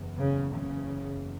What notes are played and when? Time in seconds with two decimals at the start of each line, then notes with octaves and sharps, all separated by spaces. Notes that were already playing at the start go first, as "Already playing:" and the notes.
Already playing: F#1 E2
0.16 C#3
0.55 C#3